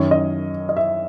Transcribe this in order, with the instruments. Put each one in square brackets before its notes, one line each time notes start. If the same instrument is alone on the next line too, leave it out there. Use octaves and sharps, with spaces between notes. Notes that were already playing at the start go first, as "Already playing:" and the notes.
Already playing: [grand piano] F#2 D#3 C#5
D#5
D#5
E5